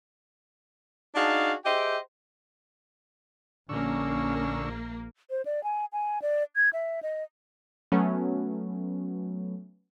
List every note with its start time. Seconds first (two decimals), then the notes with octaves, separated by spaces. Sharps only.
1.16 D4 D#4 F#4 G#4 F5 A5
1.66 G4 G#4 C5 D#5 E5 G5
3.69 A#1 D3 A#3 C#4 C#6 E6
5.30 C5
5.46 D5
5.64 G#5
5.93 G#5
6.22 D5
6.56 G#6
6.73 E5
7.03 D#5
7.92 F#3 A3 B3 C#4